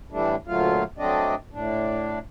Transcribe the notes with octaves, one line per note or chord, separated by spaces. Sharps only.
A2 E3 G3 A3 D4
D2 A#2 F#3 A3 F4 F5
F#3 A3 C4 D4 D5 D#5
A2 D4